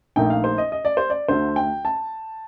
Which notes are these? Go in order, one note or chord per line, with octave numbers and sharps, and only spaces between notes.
A#1 A#2 A3 D#4 G5
F5
C5
D#5
D#5
D5
C5
D5
D2 D3 A3 C5
G5
A5